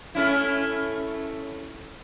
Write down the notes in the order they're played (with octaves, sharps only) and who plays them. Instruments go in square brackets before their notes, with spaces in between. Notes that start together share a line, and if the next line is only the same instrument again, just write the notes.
[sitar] A3 C#4 E4